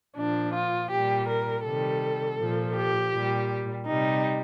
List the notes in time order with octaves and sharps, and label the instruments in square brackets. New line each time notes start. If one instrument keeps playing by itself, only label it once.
[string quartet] A#2 F3 D4
F4
A#2 G3 G4
A#4
C3 D#3 G3 A4
A#2 F3
G4
A#2 G3
C3 G3 D#4